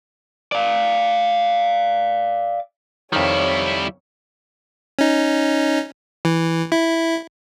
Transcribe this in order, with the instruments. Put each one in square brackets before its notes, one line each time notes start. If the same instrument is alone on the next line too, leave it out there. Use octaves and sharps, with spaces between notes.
[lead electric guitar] D5 F5
[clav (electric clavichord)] F2 D#3 [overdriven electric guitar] G3 E4 [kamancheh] C#5
[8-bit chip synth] C#4 D#4
E3
E4